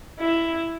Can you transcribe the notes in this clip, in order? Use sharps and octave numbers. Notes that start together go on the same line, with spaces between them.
E4